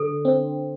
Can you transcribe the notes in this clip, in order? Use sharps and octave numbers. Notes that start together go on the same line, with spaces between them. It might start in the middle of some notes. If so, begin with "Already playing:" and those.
Already playing: D3 A4
C4